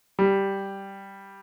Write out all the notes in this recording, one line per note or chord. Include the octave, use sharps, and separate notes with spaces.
G3